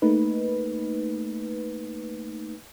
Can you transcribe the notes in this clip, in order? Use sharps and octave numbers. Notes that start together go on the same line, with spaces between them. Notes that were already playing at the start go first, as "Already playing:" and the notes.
A3 A#3 D#4 B4